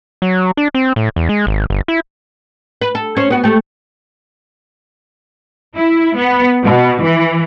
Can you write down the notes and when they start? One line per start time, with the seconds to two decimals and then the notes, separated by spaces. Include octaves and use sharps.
0.22 F#3
0.57 D4
0.75 C4
0.96 A2
1.16 E2
1.29 G#3
1.47 G#1
1.70 G1
1.88 E4
2.81 B4
2.95 A4
3.17 C#4 C5
3.30 B3 F#4
3.44 A3 G4
5.75 E4
6.16 B3
6.63 B2
7.03 E3